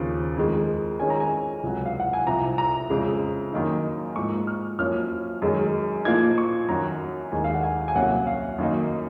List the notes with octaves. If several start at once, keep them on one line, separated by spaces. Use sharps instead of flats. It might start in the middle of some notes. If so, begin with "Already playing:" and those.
Already playing: D#2 C#3 F3 C4
F2 D#3 G#3
F2 D#3 G#3 C#4 G#5
A#5
G#5
C#2 C3 F#3
F5
F#5
G#5
C2 C3 F3 A#5
A#5
F2 C#3 G#3
F#2 D#3 A#3 D#4
G#2 F3 A#3 C#6
F6
F#2 F3 A#3 C#4 F6
F#2 D#3 G#3 C#4
A#2 F3 A#3 D#4 G#6
C#6
F#2 D#3 F#3 A#5
D#2 D#3 G#3 D#4 G#5
F5
F#5
G#5
G#5
C2 C3 F#3 A#3 C#4 F#5
F5
F#2 D#3 A#3 D#4